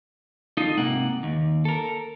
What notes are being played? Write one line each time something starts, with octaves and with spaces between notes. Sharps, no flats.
D#4 F4 A4 D#5
G#2 C3 A#3 F#5
D#2
A4 A#4